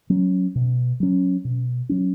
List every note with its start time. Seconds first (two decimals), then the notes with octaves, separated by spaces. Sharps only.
0.10 F#3 C#4
0.55 B2
1.00 F#3 C#4
1.45 B2
1.89 F#3 C#4